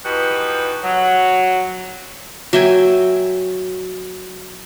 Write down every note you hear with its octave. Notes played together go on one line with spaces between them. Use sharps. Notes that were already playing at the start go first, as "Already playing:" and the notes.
E3 F3 D#4 F#4 G4 B4
F#3
F#3 E5 G5 G#5